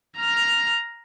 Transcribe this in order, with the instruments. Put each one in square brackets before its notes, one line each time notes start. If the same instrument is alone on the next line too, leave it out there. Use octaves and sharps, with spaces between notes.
[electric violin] A#5 F6